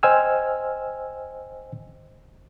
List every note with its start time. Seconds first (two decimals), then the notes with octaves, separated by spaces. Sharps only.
0.03 C5 D#5 G5 G#5 E6 F6